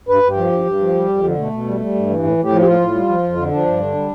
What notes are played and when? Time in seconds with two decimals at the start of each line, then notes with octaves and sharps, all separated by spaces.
0.09 G2 B4
0.23 G2
0.30 G4
0.37 F3
0.52 G2
0.66 G2
0.81 F3
0.94 G3
1.09 F2
1.23 D3
1.37 B2 A3
1.52 B2
1.67 G3
1.80 G3
1.94 G2
2.08 E3
2.23 A2
2.38 A2
2.44 G4
2.52 F3
2.61 G4
2.66 A2 F4
2.80 A2
2.94 G3
3.09 F3
3.23 F2
3.37 D3
3.51 F3 D4
3.66 G2
3.80 D3
3.95 G3